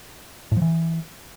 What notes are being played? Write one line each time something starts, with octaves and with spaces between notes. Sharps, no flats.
A2
F3
E3